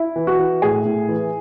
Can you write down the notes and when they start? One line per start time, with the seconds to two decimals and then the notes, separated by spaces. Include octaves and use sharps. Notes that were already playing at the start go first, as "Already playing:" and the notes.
Already playing: E4
0.16 E3
0.27 F#4
0.39 E3
0.62 A2 G#4
0.85 A2
1.08 E3